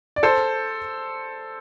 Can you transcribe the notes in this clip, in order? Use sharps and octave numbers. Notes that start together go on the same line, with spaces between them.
D5
A4 C5